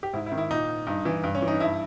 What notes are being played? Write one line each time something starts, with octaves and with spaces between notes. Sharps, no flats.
G4
G#2 E4
E4
D#3
E4
A#2 D#4
G2 D#4
E3
G2
C#4
E3
D#4
G2 E4